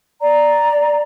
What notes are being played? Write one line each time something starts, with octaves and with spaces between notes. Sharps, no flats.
D5 A#5